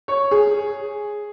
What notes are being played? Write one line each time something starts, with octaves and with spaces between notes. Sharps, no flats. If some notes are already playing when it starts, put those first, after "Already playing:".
C#5
G#4